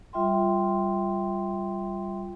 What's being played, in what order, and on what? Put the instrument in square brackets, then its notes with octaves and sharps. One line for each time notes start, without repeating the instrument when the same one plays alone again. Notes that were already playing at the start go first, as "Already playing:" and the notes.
[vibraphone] G3 F4 E5 G5 C6